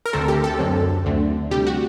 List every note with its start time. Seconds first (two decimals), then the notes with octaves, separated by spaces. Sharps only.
0.06 A#4
0.13 D2 D3 A3 C4 A4
0.28 G4
0.44 A4
0.59 F#2 D3 F#3 C4
1.05 D2 D3 A3 C4
1.51 D2 C3 G3 G4
1.67 F#4